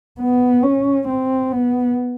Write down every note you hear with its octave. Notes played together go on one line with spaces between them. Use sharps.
B3
C#4
C4
B3